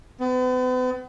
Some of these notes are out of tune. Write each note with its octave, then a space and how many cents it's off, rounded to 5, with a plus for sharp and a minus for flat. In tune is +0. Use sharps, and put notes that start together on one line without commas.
B3 +45